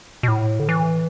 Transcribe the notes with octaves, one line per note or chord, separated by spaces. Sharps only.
B2
A2
D3
E3